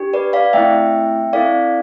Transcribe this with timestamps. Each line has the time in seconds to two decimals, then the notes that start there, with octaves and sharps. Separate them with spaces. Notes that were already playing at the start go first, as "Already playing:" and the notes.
Already playing: D4 G4
0.13 B4 D5
0.33 D5 F5
0.53 A3 C4 E4 E5 G5
1.33 C4 E4 A4 D5 F5